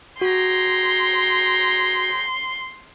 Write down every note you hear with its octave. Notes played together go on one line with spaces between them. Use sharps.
F#4 G#4 G5 A#5 C6